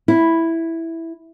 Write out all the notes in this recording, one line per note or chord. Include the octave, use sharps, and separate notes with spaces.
E4